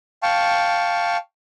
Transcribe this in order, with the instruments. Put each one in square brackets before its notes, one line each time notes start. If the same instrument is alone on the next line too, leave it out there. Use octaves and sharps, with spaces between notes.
[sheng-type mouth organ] F5 G5 A5 C#6